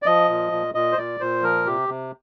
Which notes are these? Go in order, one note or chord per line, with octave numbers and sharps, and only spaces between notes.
D5
F3 D#5
A#2
A#2
A#2 D#5
C5
A#2 D5
A#2 C5
F3 A#4
C3 G4
C3